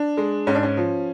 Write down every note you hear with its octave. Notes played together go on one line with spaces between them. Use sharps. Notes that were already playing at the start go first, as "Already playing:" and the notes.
Already playing: D4
G#3
G#2 C#4
D4
C#4
F3